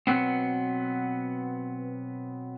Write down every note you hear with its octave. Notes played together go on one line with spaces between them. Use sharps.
B2 D#3 F#3 B3 C4